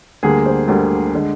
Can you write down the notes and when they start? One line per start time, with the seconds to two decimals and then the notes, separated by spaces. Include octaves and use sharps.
0.23 D2 D3 G3 A#3 G#4
0.45 C5
0.68 D2 D3 G3 A#3
1.14 D3 G#3